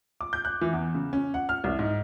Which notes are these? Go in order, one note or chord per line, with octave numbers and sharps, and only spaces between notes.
D6
G6
F#6
E3
E2
C#3
C#4
F#5
F6
C2
G#2